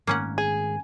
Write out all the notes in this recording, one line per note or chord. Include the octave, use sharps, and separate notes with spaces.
G#2 D#3 A3 A#3 C#4 F#5
G#4 G#5